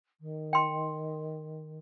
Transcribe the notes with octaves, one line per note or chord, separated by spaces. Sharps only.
D#3
G5 C6